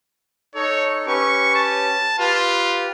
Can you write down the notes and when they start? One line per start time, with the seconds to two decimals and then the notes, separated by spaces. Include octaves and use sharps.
0.55 D#4 A4 C#5
1.07 C#4 G4 B4 C#6
1.55 A5
2.19 F4 G4 B4